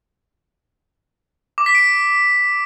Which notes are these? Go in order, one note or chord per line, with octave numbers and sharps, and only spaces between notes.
D6
B6
D7